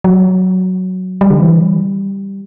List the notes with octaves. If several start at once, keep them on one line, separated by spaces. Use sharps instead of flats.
F#3
G3
D3
E3
G3